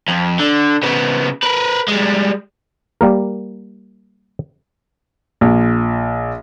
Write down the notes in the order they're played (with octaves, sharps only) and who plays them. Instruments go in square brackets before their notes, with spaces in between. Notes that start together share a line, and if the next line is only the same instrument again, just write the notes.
[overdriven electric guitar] F2
D3
C#3 B3
A#4 B4
G3 G#3
[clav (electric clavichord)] G3 A#3 A#4
[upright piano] A#1